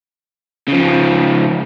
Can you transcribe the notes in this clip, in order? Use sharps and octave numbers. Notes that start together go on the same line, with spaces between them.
C#3 F3